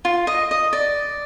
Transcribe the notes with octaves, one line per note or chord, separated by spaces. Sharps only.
F4
D#5
D#5
D5